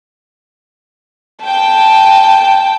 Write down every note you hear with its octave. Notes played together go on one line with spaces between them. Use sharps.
G5 A5